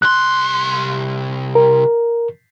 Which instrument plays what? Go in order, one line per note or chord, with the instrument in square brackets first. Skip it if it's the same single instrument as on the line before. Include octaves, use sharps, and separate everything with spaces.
[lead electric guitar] C2 C6 [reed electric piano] F#6
[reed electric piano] A#4